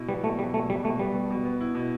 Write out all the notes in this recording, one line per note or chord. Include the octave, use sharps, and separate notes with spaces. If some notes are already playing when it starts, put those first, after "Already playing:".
Already playing: B2 E4
G3 B3
B2 A3
B2 G3
B2 A3
B2 G3
B2 A3
G3 B3
B3
B2
B3
E4
B2